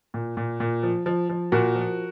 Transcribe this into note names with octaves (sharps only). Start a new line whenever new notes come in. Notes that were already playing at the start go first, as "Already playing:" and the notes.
A#2
A#2
A#2
F3
F3
F3
A#2 F#4 A#4
F3